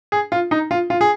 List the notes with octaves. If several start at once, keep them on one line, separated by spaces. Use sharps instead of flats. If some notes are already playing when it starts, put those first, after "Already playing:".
G#4
F4
D#4
F4
F4
G#4